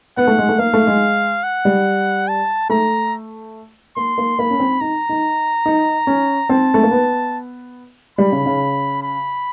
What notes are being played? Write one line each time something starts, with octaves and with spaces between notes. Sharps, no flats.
B3 F#5
A3
G#3
A3
A#3 F5
A3
G#3
F#5
G3
A5
A3 A#5
A#3 C6
A#3
A#3 B5
C#4
C4
D#4 A#5
D#4
D#4
C#4
C4 A5
A3
A#3
B3
G3 B5
C#3
C#3
B5